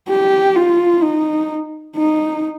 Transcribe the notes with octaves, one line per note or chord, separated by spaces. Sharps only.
G4
F4
D#4
D#4